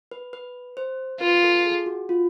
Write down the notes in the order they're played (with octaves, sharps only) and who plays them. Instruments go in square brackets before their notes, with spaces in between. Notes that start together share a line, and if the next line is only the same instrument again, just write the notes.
[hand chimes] B4
B4
C5
[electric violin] F4 [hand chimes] B4
[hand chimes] A4
G#4
F#4
F4